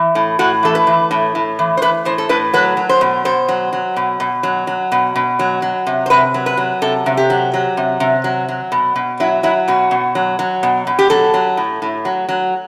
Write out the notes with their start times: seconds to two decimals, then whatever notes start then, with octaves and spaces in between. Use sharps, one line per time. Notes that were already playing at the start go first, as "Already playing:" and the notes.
Already playing: E3
0.15 A2
0.39 A2 F#4
0.63 E3 A4
0.75 B4
0.87 E3
1.11 A2
1.35 A2
1.59 E3
1.77 C5
1.82 E3 B4
2.05 A2 C5
2.18 A4
2.29 A2 B4
2.54 F#3 B4
2.77 F#3
2.89 C5
3.01 B2
3.25 B2 C5
3.48 F#3
3.73 F#3
3.96 B2
4.20 B2
4.43 F#3
4.67 F#3
4.92 B2
5.16 B2
5.39 F#3
5.62 F#3
5.87 C3
6.06 C5
6.10 C3 B4
6.34 F#3
6.46 B4
6.57 F#3
6.82 C3 A4
7.06 C3
7.17 G4
7.30 F#3
7.54 F#3
7.77 C3
8.00 C3
8.24 F#3
8.49 F#3
8.72 B2
8.96 B2
9.20 F#3 E4
9.43 F#3 E4
9.68 B2 F#4
9.91 B2
10.15 F#3
10.39 F#3
10.63 B2
10.87 B2
10.99 G4
11.10 F#3 A4
11.34 F#3
11.57 A2
11.82 A2
12.05 F#3
12.29 F#3